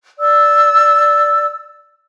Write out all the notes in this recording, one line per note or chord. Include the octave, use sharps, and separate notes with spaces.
D5 E6